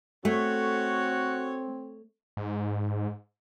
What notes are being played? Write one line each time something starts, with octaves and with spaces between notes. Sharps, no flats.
A3 C4 F#4 A4 C#5
G#2